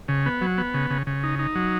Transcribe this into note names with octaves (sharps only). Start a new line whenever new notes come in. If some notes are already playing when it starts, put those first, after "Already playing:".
C#3
B3
F#3
B3
C#3
C#3
C#3
D#4
D#4
F#3